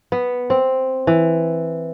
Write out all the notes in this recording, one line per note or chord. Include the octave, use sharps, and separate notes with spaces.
B3
C4
E3